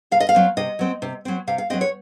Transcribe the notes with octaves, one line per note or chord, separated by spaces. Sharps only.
C3 F5
D#5
F5
F#3 C4
C3 D#5
F#3 C4
C3
F#3 C4
C3 F5
F5
F#3 C4 D#5
C#5